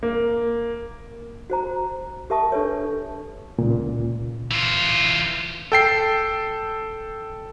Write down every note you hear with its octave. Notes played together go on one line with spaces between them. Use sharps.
A#3
F#4 C5 A#5
G4 A#4 E5 A5 C#6 D#6
D4 A4 B4 C#5
C#2 A#2
E3 F4
A4 G5 C7